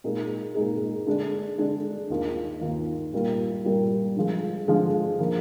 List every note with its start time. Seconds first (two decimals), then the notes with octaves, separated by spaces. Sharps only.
0.04 A#2 G#3 D#4 G#4
0.55 A#2 G#3 D#4 G#4
1.06 D3 G#3 D4
1.58 D3 G#3 D4
2.10 D#2 D#3 A#3 F4
2.61 D#2 D#3 A#3 F4
3.13 A#2 G3 A#3 F4
3.65 A#2 G3 A#3 F4
4.16 D3 F3 G#3
4.68 D3 F3 G#3
5.19 F3 A#3